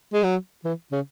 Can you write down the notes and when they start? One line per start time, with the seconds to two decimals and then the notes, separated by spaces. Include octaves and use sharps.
0.13 G#3
0.23 F#3
0.65 E3
0.92 C#3